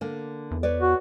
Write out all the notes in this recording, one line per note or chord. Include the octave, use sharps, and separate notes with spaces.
D3 A#3
E2
B4 C#5 D5
F#4